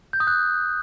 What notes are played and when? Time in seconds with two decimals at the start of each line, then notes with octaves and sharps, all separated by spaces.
0.13 G6
0.20 D#6
0.27 F#6